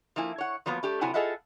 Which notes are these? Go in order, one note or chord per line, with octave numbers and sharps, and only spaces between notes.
F3 A#3 E4 G#5
C#5 F#5
F3 F#3 A#3 B3
A3 D4 G4
C3 F#3 E4 F#5 G#5
F4 G#4 A4 D#5 E5 F#5